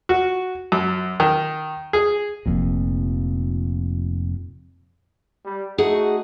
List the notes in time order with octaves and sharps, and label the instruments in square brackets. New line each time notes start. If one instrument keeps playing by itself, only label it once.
[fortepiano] F#4
F#2
D#3
G#4
[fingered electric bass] F1 F2 A#2
[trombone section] G3
[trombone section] A3 D#4 F#4 [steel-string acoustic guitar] G#4 F#5